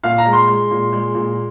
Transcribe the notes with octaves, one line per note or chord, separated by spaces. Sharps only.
A#2 F5
A#5
G#3
C6
G#3
A#2
G#3
A#2